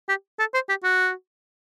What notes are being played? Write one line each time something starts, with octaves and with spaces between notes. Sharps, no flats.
G4
A4
C5
G4
F#4